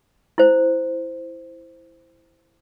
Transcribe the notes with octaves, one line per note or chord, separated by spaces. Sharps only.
E4 C5